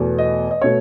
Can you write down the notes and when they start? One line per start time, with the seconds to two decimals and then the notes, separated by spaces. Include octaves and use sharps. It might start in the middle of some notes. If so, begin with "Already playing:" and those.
Already playing: E2 B2 A3
0.18 D#5
0.51 D#5
0.61 B2 A3 C#5